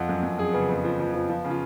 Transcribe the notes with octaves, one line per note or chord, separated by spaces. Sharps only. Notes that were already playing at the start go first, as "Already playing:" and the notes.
Already playing: F2 F#5
F#2
F#2
F#2 G#4
C#3 B3
F2 B3
F3
F2
F3
F3
C#3
F4